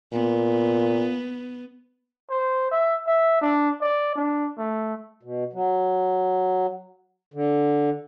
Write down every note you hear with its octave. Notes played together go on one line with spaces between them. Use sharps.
A#2 B3
C5
E5
E5
D4
D5
D4
A3
B2
F#3
D3